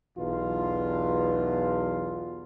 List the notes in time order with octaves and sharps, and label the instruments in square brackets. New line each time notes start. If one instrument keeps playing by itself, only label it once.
[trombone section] B1 E2 B2 F4